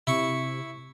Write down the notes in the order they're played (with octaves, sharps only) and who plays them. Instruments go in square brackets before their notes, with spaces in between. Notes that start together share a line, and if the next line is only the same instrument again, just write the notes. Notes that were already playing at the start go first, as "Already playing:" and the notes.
[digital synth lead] C3 [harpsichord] E4 C#6